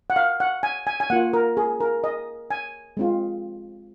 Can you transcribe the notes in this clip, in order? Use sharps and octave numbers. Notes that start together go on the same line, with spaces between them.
F#5
F5
F#5
G#5
G#5
G#5
A#3 F4 F#5
A#4
G#4
A#4
D#5
G#5
G#3 C4 F4